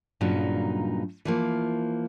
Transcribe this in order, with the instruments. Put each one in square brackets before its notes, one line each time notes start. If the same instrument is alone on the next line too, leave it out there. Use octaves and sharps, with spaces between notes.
[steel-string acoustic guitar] G2 A#2 C#3 F#3 D#4
E3 F3 A#3